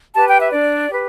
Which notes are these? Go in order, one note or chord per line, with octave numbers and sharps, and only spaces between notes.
G4 B4 A5
G5
E5
D4 D5
G4 B4